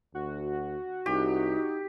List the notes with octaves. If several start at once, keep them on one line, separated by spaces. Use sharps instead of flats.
D2 F#4
C2 D#4 G4